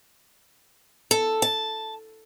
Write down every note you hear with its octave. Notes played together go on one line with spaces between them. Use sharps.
A4
A5